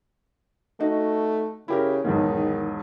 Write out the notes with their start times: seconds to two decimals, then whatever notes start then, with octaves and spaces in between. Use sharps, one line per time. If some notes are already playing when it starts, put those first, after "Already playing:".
0.80 A3 D#4 F#4
1.68 C#3 E4 G4 A#4
2.04 B1 E2 G#2 D#3